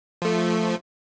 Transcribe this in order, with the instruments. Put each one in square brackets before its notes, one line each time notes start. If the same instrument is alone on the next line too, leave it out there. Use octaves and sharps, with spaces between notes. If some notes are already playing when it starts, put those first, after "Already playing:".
[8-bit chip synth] F3 A3